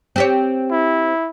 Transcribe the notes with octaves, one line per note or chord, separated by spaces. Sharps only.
C4 G4 C#5
E4